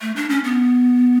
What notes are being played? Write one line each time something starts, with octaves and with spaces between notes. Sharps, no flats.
A3
D4
C#4
B3